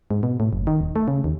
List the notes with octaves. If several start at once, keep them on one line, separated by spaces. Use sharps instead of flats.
G#2
B2
A2
F#1
D#3
D#1
A3
C#3
D#2